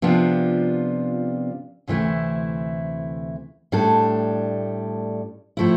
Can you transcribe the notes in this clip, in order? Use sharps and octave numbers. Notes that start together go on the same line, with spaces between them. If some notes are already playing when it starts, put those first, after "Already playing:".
C3 F3 B3 D4 F4
D2 C3 E3 A3 E4
A2 G3 D4 A4
A2 F3 A3 E4